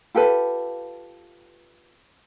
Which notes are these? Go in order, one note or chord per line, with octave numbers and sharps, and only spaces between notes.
F4 G4 A4 B4